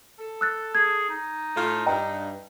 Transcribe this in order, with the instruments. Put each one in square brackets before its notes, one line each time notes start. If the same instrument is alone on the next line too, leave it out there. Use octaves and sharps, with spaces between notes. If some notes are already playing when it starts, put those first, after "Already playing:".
[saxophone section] A4
[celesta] E6 F#6 A6
[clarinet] G#4 [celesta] G#6
[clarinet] D#4
[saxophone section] A2 F4
[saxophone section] G2 [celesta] D#5 G5 A#5